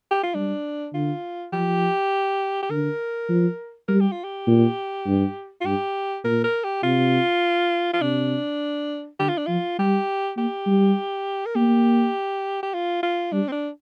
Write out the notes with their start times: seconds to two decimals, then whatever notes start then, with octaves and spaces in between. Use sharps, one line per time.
0.11 G4
0.23 F4
0.34 G3 D4
0.93 D3 F4
1.53 F3 G4
2.62 G4
2.70 D3 A#4
3.29 F3
3.88 G3 A#4
4.00 G4
4.12 F4
4.24 G4
4.47 A#2
5.06 G2
5.61 F4
5.66 G2 G4
6.24 A#2 A#4
6.44 A#4
6.64 G4
6.83 C3 F4
7.93 F4
8.01 C3 D4
9.19 D3 G4
9.29 F4
9.38 D4
9.46 F3 F4
9.79 G3 G4
10.37 A#3 G4
10.67 G3
11.45 A#4
11.55 A#3 G4
12.63 G4
12.74 F4
13.03 F4
13.32 G3 D4
13.48 C4
13.52 D4